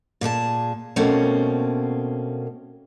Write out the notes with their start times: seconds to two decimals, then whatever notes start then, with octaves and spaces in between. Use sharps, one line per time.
0.21 A#2 G#4 C#5 A5
0.96 B2 A3 A#3 C4 C#4